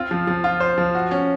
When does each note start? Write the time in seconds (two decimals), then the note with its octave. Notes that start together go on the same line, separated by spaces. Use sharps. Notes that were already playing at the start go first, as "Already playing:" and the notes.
Already playing: C4 F4
0.11 F3
0.27 F3
0.44 F4
0.60 C5
0.78 F3
0.95 F#4
1.11 C#4